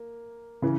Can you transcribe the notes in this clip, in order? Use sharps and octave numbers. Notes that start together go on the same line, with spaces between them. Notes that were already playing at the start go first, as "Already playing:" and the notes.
Already playing: A#3
C#3 E3